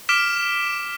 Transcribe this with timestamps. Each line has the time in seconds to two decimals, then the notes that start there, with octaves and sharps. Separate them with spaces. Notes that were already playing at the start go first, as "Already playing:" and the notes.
0.09 D6 F6 B6 D7 E7